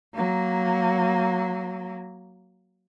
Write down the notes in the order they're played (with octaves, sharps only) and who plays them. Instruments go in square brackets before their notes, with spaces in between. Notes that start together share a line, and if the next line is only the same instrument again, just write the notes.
[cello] F#3 A#3